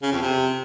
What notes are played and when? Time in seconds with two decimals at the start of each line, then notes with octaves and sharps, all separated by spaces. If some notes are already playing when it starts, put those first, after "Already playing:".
0.02 C#3
0.12 F2
0.22 C3